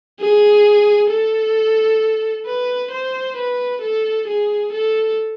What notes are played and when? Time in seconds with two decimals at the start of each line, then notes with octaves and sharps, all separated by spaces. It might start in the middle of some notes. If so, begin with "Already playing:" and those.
0.20 G#4
1.10 A4
2.46 B4
2.91 C5
3.36 B4
3.81 A4
4.28 G#4
4.72 A4